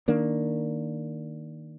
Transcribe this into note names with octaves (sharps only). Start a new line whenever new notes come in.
D#3 A#3 D4